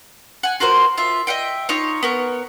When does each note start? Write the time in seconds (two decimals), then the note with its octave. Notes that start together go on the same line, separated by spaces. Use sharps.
0.43 F#5 G#5
0.60 F4 F#4 A#4 C5
0.98 F4 E5
1.27 D#5 E5 F#5 G5
1.69 D#4 F4 C#5
2.03 B3 A#4 C#5